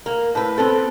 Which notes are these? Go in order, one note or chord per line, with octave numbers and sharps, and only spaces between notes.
A#3
A2 B4
B3 C4 A4